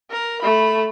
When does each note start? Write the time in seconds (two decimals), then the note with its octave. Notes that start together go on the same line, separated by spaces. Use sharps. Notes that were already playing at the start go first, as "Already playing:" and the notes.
0.11 A#4
0.42 A3 B5